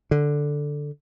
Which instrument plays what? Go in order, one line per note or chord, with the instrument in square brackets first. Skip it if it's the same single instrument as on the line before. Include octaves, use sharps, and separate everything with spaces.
[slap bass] D3